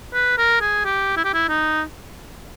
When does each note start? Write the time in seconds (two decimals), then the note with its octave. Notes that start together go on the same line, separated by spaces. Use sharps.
0.14 B4
0.38 A#4
0.61 G#4
0.85 G4
1.17 E4
1.25 G4
1.34 E4
1.49 D#4